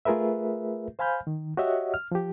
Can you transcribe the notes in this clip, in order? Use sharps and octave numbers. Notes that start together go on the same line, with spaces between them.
A3 F4 G#4 A#4 B4 E5
C5 F5 G#5 B5 F6 G6
D#3
F#4 G4 C#5 D#5 E5 F#5
F6
F3 G4